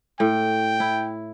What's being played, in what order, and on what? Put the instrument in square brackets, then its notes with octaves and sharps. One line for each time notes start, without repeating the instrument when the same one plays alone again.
[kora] A2 [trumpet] G5
[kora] E4